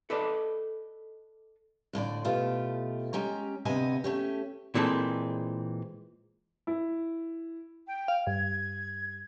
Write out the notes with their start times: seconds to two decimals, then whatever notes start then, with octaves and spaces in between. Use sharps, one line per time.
0.10 A4 B4 D5 D#5 A5 B5
1.93 F2 A2 D3 D5
2.24 B2 A3 F4 G4
3.13 G#3 C#4 G4 A#5
3.65 D2 C3 B3 D#5 G#5
4.04 A3 C#4 G4
4.75 A#2 E3 G#3 C4 A4
6.67 E4
7.87 G5
8.08 F5
8.27 G2 G#6